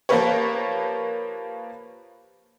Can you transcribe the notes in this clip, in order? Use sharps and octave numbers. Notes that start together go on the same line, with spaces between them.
F3 A#3 G4 A#4 B4 C#5